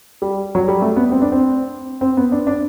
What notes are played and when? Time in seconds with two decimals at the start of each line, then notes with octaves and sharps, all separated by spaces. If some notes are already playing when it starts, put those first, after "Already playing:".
0.22 G3
0.55 F#3
0.68 G3
0.82 A3
0.96 B3
1.12 C4
1.22 D4
1.32 C4
2.01 C4
2.17 B3
2.32 D4
2.47 D4